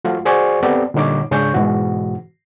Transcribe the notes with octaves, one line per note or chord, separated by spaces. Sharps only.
F3 A3 F4 F#4
F#4 G#4 C5 D5 G#5 C#6
B3 C4 G4 A4 D5
A#2 D3 G3 D#4 C#5 D6
G#2 C#3 C#4 D4 C#6 G6
G#2 B2 E3 F#4